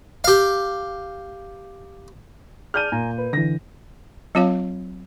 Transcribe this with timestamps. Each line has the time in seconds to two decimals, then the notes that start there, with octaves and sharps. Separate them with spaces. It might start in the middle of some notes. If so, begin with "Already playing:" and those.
0.24 G4 F5
2.74 G#4 D5 A5 F6 G6 D#7
2.92 A#2 G#5 A#5
3.18 B4
3.33 D3 E3 A#6
4.35 F#3 C4 F4 C#5 F5